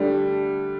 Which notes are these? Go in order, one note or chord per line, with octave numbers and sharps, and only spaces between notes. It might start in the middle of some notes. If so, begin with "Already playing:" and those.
Already playing: D3 G3 A3 D4